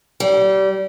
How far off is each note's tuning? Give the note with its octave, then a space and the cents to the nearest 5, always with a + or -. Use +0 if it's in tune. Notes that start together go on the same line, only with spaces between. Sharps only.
G3 -25